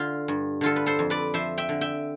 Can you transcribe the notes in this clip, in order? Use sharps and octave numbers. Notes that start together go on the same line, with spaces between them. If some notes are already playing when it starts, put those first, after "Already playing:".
Already playing: D3 F4
G2
D3 F4 A4
B4
A4 C5
F2
B4 D5
F3 C5 E5
E5 G5
D3
E5 G5